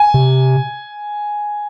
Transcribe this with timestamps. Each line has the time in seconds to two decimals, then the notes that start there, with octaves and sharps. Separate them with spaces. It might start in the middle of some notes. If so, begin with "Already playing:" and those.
Already playing: G#5
0.14 C3